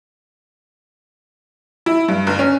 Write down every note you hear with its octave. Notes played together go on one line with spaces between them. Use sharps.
E4
G2
G1
C#4